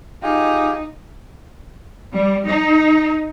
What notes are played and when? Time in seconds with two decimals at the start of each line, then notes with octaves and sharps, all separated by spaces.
0.23 D#4 F4 G4 G#4 G5
2.15 G3
2.46 D#4